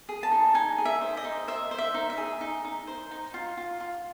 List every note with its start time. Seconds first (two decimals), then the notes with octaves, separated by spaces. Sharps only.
0.09 G#4
0.23 A5
0.32 D#4
0.55 D#4 G#5
0.78 G#4
0.85 E5
1.01 C5
1.17 D#5
1.24 D#4
1.47 C5 E5
1.71 C5
1.78 E5
1.94 D#4
2.10 E5
2.17 G#4
2.41 D#4
2.64 D#4
2.87 C5
3.11 D#4
3.34 F4
3.57 F4
3.80 F4